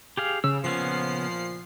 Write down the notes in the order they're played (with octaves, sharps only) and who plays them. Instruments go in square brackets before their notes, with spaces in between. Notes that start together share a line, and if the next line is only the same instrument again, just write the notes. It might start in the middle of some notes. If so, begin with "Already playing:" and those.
[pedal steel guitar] G4 G#4 F5
[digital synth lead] C#3 [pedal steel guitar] E6
[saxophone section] A#2 F3 [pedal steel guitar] C#3 B3 C#4 [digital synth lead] C7